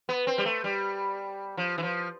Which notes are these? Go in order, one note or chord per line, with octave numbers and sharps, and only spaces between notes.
B3
C4
G3
A3
G3
F3
E3
F3